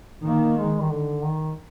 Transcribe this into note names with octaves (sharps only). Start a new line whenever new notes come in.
D#3 A#3
G#3
D#3
D3
D#3